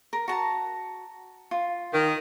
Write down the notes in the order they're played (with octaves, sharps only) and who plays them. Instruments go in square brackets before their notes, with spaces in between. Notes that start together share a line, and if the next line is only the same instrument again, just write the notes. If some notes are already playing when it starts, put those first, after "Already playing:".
[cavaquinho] A#4
F#4 A5 A#5
F4
[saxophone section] D#3